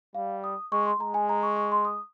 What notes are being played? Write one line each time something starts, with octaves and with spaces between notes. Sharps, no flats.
G3 F5
D#6
G#3 C#6
C6
G#3 A#5
G#5
A#5
C#6
C#6
C6
D#6